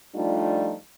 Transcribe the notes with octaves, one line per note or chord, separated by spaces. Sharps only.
F3 G3 A3 D4 D#4 F4